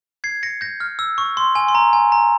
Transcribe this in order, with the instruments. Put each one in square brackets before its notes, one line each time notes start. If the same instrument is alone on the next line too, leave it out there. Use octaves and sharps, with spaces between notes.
[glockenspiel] G#6 C7
A#6 C#7
G6 A#6
F6
E6
C#6
C6
G#5
C6
A#5
G#5
A#5